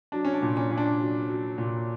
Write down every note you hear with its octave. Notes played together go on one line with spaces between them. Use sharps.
F#3 D4
C#4
D4
A#2
C#4
A#2
D4
F#3
F#3
A#2